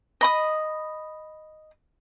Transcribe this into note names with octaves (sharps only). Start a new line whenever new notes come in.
D#5 B5 D#6